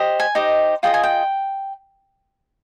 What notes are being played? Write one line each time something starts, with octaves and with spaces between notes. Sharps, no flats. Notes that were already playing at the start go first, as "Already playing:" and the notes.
Already playing: G4 C5 D#5
G#5
D#4 G4 C5 D#5
F4 G#4 B4 D#5 G5
G#5
G5